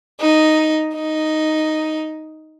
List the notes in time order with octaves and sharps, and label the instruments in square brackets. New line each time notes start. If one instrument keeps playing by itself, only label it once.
[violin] D#4
D#4